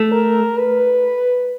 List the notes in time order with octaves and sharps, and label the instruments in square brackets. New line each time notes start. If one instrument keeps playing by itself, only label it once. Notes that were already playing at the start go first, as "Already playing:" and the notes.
Already playing: [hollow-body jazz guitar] A3
[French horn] A#4
B4